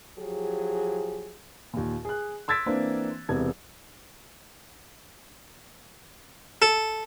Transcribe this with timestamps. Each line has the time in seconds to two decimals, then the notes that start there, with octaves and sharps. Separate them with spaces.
0.19 F3 F#3 G4 G#4
1.73 D#2 A#2
2.05 G#4 F#6
2.48 C6 E6 G#6 A6 B6 D7
2.66 E3 A#3 C4 D4
3.29 E1 E2 C3 G#6
6.62 A4